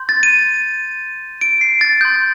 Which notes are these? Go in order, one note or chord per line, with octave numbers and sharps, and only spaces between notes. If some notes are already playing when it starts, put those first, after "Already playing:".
Already playing: C6 G6
A6
D#7
D7
C7
A6
C6 D#6 G6